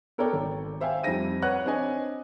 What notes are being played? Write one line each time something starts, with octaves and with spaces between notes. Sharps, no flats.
B3 A4 A#4 C#5 D5 G5
G#1
C5 E5 F5 G5 G#5
F2 G3 C4 D#4 A#6 D#7
B4 C#5 F#5 F#6
C4 D4 B4 C#5 D#5 G#5